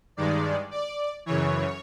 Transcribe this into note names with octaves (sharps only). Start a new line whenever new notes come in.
G2 D#3 G#3 D5
D5
F#2 C#3 E3 C#5